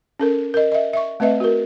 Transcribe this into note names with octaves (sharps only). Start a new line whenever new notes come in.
C#4 A4 A#4
A#4 D#5
D#5 E5
E5 C#6
A3 C4 B4 D#5 E5
F#4 A#4